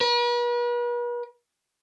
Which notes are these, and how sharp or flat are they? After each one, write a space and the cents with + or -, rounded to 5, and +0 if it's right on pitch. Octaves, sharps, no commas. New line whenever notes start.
B4 -45